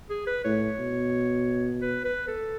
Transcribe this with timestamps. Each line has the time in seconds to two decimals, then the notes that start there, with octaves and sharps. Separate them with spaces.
0.10 G#4
0.27 B4
0.45 A2 C#5
0.79 B2
1.82 B4
2.05 B4
2.28 A4